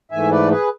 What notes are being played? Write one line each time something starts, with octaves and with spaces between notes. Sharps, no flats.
G#2 E3 A3 E5 G#5
B4 D5
G#4 B4